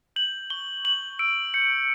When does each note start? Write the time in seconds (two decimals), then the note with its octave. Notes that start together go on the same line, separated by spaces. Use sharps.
0.16 G6 F#7
0.50 C#6 G7
0.85 C#6 F#7
1.19 E6 D7
1.54 G6 C#7